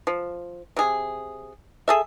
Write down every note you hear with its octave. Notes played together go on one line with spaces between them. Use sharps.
F3
C3 G#4
G#4 A4 E5